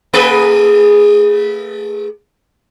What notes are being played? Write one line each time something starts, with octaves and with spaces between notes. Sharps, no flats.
A3 G#4 B4